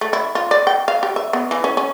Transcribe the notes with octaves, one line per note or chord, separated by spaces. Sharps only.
A3
E4
F4
D5
G5
F5
G4
E5
B3
E3
C#4
C#4